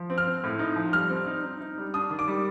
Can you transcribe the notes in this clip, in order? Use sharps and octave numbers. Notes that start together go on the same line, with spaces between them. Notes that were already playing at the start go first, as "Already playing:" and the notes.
Already playing: F3
C4
F6
C4
A2
D#4
F3
G3 F6
C4
D#4
D#4
D#4
G3
D4 D#6
D#3
D6
G3